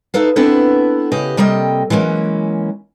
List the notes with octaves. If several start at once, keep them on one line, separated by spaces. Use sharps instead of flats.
D#4 E4 A4 B4 F5
B3 C4 D4 E4 A4 B4
C#3 G4 B4 D#5
C3 G3 A#3 A4 D#5 G5
E3 F#3 G#3 A#3 C#4